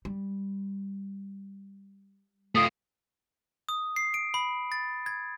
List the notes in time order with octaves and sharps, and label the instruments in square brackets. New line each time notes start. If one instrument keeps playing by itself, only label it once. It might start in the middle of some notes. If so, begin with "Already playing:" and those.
[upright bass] G3
[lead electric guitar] A3 F4 [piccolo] D#6
[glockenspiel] D#6
C7
D7
B5
A6
G#6